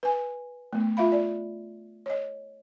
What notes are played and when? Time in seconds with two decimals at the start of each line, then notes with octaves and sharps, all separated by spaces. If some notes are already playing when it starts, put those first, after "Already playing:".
0.03 B4 G#5
0.73 A3 B3
0.97 F4 E5 F5 B5
1.12 D5
2.06 C#5 D#5